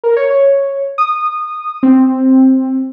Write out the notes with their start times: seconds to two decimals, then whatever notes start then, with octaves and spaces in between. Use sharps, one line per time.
0.04 A#4
0.17 C#5
0.30 C#5
0.98 D#6
1.83 C4